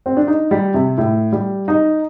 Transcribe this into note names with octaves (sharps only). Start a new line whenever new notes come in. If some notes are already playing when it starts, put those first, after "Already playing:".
C4
D4
D#4
G3
C3
A2
G3
D#4